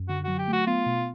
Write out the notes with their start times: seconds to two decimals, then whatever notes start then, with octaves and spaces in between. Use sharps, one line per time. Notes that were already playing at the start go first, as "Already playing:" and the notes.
Already playing: F#2
0.09 D3 F#4
0.24 F#3 F#4
0.39 G4
0.48 A3
0.53 F#4
0.67 B3 F4
0.86 B2